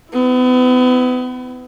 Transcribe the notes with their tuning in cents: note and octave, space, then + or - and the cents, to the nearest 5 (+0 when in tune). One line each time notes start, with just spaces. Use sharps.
B3 +35 E4 +0